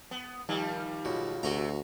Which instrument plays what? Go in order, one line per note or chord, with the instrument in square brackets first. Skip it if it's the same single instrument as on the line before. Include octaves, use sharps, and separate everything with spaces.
[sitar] B3
D#3 F3 G3
[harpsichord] C#2 B2
[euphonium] D2 [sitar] C3 [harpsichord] F#4 A#5